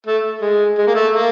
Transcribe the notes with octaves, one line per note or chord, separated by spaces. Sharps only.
A3
G#3
G#3
A#3
A3
A#3